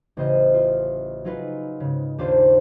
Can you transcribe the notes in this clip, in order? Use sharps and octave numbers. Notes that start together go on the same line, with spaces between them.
A1 C#3 C5 D#5 F6
F4
F#3 D#4 F4 G#4 B4
G#2 C#3
D#2 D4 F4 C5